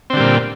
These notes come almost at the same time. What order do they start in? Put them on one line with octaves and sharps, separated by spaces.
C4 D3 G3 A#2